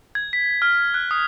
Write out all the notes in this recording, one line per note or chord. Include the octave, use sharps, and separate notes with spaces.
G#6
B6
F6
F#6
D#6